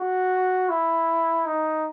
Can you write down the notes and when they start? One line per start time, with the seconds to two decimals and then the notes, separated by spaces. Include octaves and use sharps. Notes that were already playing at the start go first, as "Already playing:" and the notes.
Already playing: F#4
0.69 E4
1.46 D#4